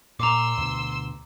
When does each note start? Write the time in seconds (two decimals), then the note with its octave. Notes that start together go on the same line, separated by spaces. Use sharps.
0.19 A#2 A#5 C6 D6 E6
0.58 D2 B2